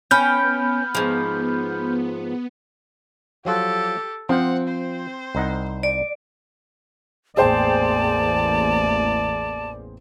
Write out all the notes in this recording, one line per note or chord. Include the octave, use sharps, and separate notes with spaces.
B3 C#4 G5 B5 F6 G6
G#2 F3
F3 F#3 F4 G4 A4
F3 C4 F#5
C5
C2 D#4 F#5
D5
A1 E2 A#3 G#4 C5 D5 G5 A5